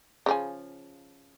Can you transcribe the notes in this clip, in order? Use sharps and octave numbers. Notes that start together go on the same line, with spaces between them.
C#3 F3 G#5